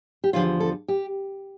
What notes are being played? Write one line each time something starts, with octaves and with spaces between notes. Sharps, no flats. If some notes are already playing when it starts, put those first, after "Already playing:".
G4
E2 D3 F3 F4
A4
G4